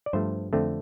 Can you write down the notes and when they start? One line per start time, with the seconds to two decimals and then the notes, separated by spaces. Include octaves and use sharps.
0.06 D5
0.13 G2 F3 A3 C5
0.53 F2 D3 A3 C4